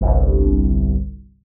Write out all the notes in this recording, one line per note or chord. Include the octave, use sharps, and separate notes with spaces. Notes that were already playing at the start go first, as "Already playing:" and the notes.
G1 C2